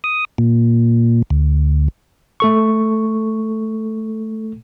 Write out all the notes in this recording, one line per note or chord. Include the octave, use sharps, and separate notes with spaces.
D#6
A#2
D2
A3 A4 C#6